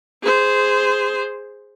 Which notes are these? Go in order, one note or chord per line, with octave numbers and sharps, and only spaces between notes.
G#4 C5